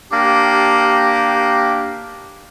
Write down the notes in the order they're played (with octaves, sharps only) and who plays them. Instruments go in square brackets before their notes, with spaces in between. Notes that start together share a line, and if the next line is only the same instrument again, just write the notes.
[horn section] A#3 D4 G4